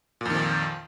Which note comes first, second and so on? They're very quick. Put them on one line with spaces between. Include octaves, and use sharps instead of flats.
A#2 F2 D#3 F3